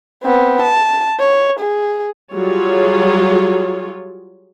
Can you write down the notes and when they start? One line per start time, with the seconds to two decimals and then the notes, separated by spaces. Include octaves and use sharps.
0.23 B3 C4
0.62 A5
1.19 C#5
1.59 G#4
2.34 F#3 G3 F4 G#4 C#5